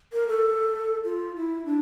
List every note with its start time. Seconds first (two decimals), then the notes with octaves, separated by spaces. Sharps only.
0.13 A#4
0.28 A4
1.04 F4
1.36 E4
1.66 D4